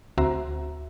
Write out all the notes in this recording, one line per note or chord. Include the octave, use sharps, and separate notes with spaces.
D2 C4 F#4 C5 E5 A#5